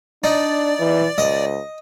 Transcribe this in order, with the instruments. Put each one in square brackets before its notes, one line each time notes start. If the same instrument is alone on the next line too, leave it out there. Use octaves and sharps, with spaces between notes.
[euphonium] D4 [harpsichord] D#4 [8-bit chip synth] D5
[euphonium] E3
[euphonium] C#2 [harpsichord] D#5